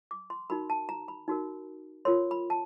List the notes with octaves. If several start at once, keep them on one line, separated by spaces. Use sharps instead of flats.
D6
C6
D#4 F#4 A#4 B5
A5
A#5
B5
D#4 F#4 A#4
F4 A#4 C#5 C6
B5
A5